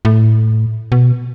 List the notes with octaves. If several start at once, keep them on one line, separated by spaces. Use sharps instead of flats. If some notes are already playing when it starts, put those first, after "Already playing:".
A2
B2